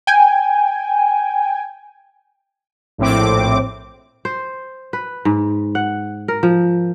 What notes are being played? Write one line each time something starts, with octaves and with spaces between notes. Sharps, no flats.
G5 G#5
A#1 A2 C4 D6
C5
B4
G#2
F#5
A#4
F3